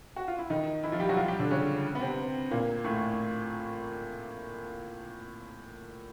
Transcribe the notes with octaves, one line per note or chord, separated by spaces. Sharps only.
F#4
F4
E4
D#3 D#4
E3 E4
F3 F4
G3 G4
F#3 F#4
F3 F4
G3 G4
D3 D4
C#3 C#4
B3
C3 C4
A#2 A#3
A2 A3